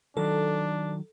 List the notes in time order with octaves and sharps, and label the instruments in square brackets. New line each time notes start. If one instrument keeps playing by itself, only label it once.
[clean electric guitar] D#3 F#3 [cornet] D4 [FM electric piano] A4